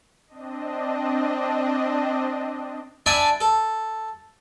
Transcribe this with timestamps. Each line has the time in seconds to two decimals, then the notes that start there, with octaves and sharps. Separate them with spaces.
0.27 C4 D4 D#5
3.06 D4 D5 E5 G#5 A5 B5
3.41 A4